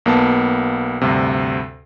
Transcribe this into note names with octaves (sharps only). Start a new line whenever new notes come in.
B1 A#3 B3 A5
D2 G2 C3